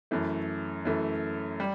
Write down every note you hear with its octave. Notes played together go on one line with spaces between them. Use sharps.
F#2 E3 A3
F#2 E3 A3
G3